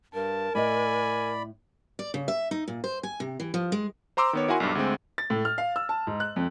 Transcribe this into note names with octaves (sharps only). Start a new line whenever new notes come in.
G2 A#4 A5
A2 D5 D#5 G#5 B5
D5
C#3
E5
D#4
A#2
C5
G#5
C3
E3
F3
G#3
C5 A#5 C6 D6 E6
D#3 B3 C#5
E4 F#4 A#4 F#5 G#5 C6
B1 G2
D2 G#3 C4
A6
A2
F6
F5
E6
A5
G#2
F#6
F2